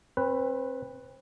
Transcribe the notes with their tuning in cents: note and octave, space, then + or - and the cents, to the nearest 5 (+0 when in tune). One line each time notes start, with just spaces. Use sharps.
C4 +30 B4 +0